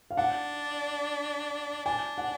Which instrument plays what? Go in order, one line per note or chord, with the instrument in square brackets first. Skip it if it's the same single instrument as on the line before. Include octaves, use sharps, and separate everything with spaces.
[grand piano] F5
[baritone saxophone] D4 [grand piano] F#5
[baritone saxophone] D4 [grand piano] G#5
[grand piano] F#5